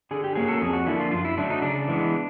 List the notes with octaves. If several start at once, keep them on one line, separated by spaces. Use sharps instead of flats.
D3 G#4
G4
F#3 A#3 C#4 G#4
A4
F2 G#4
F#4
D3 F3 A#3 D4 E4
F4
F#2 F4
E4
D3 F#3 A3 D4
D#4
C#3 D4
E3 G#3 B3